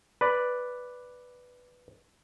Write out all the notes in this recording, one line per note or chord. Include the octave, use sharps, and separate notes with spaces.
B4 D5